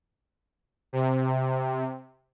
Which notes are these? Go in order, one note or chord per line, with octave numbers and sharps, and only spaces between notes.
C3